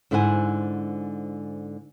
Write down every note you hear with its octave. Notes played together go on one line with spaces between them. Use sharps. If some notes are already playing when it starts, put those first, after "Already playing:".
G#2 D3 E4 C5 F#5 G#5